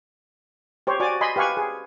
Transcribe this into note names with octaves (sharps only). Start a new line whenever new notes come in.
G4 C5 C#5
F#4 D5 G#5 D6
D#5 G#5 B5 C6
G4 B4 F5 G#5 C#6
G#4